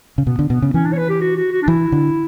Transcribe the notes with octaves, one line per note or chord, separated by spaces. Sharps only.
C#3
B2 B3
D3
B2 B3
C#3
E3 C#4
D4
C#5
B4
G4
F#4
F#4
F#4
D4
E3 E4
D3